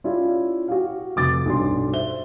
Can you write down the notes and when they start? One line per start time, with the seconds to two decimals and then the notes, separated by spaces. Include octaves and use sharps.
0.04 C#4 E4 F4 G4 D5
0.68 F#4 G4 F5
1.16 F1 D6 A6
1.46 B1 G2 C6
1.93 C5 E5 G7